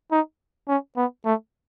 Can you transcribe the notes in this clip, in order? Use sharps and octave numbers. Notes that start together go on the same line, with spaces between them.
D#4
C#4
B3
A3